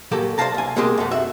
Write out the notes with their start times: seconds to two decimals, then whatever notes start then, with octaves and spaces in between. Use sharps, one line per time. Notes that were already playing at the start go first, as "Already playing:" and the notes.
0.11 A#2 F#3 G4 A4 A#4
0.38 C5 D5 E5 F5 A5 A#5
0.54 C2 G#5
0.76 B2 G#3 A#3 C4 G4 G#4
0.98 F#2 A3
1.11 F#4 E5